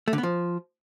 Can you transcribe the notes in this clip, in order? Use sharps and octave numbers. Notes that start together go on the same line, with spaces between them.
A3
D3
B3
F3